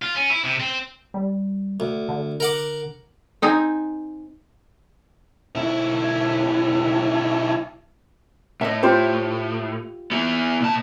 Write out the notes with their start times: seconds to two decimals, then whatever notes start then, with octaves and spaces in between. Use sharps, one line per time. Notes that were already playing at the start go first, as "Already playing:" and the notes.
0.02 F4
0.16 C#4
0.30 E4
0.44 C3
0.60 C4
1.14 G3
1.80 D2
2.09 D3
2.40 A#4 F#5 D6
3.42 C4 D#4 G#5
5.55 B1 E4
8.61 A2 D#5 E5
8.83 F4 G4 C5
10.11 B3 E4
10.60 A#2 A5